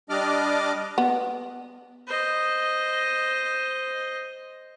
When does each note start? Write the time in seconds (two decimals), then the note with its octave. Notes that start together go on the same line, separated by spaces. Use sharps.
0.10 G3 D4 D5 D#5 D6 F6
0.98 B3
2.07 C5 D#5